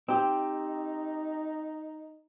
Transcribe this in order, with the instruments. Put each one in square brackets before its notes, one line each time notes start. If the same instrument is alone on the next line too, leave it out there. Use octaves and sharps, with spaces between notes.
[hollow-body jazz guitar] C4 G4 [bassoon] D#4